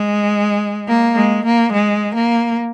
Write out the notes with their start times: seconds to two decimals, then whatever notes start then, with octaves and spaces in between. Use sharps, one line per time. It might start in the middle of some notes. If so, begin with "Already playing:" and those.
Already playing: G#3
0.88 A#3
1.16 G#3
1.45 A#3
1.73 G#3
2.15 A#3